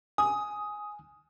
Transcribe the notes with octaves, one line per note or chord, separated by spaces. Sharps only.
G#5 D#6